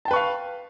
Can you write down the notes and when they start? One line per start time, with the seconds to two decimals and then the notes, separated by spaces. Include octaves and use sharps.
0.05 A5
0.08 G5
0.11 B4
0.13 C#6
0.16 F5